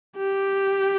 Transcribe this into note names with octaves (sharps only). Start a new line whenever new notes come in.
G4